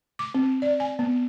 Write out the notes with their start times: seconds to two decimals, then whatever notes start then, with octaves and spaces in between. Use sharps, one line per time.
0.19 D6
0.35 C4
0.62 D5
0.80 G#5
0.99 B3